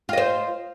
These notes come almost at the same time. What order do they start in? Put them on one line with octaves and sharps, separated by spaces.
F4 D#5 C5